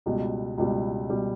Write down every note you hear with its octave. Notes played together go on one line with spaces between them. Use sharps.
C#2 B2 G3
C#2 B2 G3
B2 G3